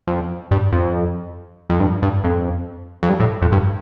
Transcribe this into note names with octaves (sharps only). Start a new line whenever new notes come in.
F2
G2
F2
F2
G2
G2
F2
F2
G2
A2
F2
G2